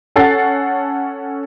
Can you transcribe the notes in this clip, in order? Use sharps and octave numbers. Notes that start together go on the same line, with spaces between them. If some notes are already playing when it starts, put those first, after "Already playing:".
C#4 A4 F#5 A6 C7